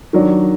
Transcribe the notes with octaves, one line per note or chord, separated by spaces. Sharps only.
D#3 F#3 D4